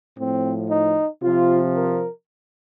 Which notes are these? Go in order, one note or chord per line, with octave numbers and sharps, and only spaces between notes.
A2 F3 C4
D#4
C3 F3 F4
A#4